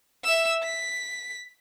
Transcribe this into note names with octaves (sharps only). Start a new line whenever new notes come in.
E5 E6
B6